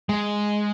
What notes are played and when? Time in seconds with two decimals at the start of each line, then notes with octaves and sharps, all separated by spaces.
0.09 G#3